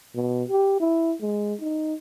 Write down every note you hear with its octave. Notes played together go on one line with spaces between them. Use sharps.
B2
G4
E4
G#3
D#4